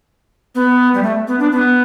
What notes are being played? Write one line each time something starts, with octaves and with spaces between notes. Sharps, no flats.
B3
G3
A3
B3
D4
B3